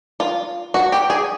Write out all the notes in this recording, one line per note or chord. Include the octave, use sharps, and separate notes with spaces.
F4
F#4
G4
G#4